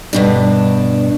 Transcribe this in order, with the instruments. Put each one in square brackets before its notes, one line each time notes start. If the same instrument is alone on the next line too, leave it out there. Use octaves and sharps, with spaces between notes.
[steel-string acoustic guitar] G2 B2 D4